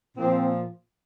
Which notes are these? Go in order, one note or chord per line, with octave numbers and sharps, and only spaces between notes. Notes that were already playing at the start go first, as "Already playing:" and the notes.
A#2 F3 C4